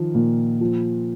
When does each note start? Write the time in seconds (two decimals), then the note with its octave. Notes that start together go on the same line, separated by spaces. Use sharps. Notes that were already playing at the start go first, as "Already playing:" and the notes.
Already playing: D#3 F3
0.15 A#2
0.61 F3